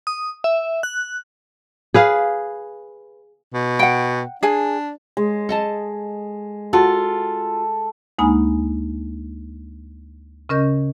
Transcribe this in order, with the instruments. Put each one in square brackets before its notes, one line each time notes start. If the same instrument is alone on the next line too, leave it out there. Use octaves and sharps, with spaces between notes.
[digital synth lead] D#6
E5
F#6
[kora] G#4 B4 F5
[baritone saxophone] B2
[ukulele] F#5 G5
[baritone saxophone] D4 [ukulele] G#4 G#5
[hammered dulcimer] G#3
[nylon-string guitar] A4 D#5 A5
[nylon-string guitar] F4 F#4 [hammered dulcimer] A4
[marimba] D2 G#3 A#3 D#4 G#5 B5
C#3 C#4 A#4 D#5 G6